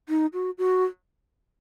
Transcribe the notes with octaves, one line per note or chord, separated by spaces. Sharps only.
D#4
F#4
F#4